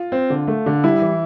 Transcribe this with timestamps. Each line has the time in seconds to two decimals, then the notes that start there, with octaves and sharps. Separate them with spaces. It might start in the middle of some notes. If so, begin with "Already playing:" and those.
Already playing: F4
0.12 C4
0.30 D3
0.47 A3
0.66 D3
0.83 G3 E4
1.02 E3